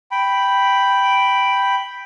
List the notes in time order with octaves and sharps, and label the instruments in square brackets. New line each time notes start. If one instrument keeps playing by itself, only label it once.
[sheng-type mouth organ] G5 B5